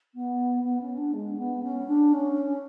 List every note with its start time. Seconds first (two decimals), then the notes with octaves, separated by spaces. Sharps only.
0.14 B3
0.63 B3
0.81 C#4
0.97 D4
1.13 G#3
1.38 B3
1.62 C#4
1.87 D4
2.12 C#4